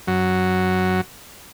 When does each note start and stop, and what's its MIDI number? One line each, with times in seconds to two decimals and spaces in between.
0.08 1.01 42
0.08 1.01 54